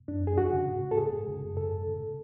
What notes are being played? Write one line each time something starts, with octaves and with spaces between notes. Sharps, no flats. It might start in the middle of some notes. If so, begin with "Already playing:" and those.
F#2 D4
F#2 G#4
F2 F#4
C#3
G#2
G#2
A4
G#2 G#4
G#2
C#3
F#2
G#2 A4
G#2
C#3